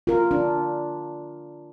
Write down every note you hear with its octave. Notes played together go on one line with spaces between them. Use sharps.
F4 A#4
D4